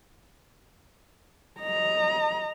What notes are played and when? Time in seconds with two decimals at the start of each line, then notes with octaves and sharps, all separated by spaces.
1.60 D#5 A#5